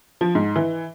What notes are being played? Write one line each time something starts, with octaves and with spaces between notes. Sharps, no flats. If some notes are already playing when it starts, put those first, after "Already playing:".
F3
G#2
E3